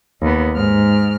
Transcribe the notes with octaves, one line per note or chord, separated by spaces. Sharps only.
D#2 B3
G#2 F6